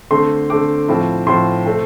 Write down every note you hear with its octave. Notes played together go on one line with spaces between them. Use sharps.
D3 A3 C4 C6
D3 A3 C4 D6
A2 F3 C4
A2 F3 C4 C6
C3 A3 C4